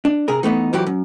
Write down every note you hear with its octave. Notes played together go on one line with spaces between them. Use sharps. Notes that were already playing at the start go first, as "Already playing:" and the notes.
D4
C3 G#4 A#4
E3 A3 B3 D#4
F2 E3 F#3 G4
F#2